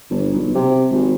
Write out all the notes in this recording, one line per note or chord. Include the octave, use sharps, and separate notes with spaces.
G1
B1
C3
G#1